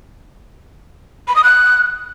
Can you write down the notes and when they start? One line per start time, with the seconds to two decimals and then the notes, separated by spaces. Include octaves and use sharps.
1.28 B5
1.36 D#6
1.44 F#6